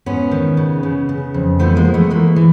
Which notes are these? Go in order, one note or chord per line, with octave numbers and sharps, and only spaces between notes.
G#2 B3 C#4
D#3
C#3
C#3
C#3
F2
F3 A3 B3
G#3 A#3
F3
A3 B3
E3 G#3 A#3
E3